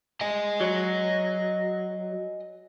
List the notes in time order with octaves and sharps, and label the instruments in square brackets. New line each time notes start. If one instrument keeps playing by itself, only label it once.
[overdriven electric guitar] D#5 G#5
[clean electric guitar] F#3